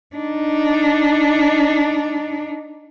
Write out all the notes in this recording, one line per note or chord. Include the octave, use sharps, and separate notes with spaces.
D4 D#4